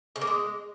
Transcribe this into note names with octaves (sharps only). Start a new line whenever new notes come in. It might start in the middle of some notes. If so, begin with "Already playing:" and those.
C#3
A#3
G#3